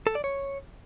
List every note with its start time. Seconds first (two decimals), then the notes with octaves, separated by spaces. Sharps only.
0.07 A4
0.15 D5
0.24 C#5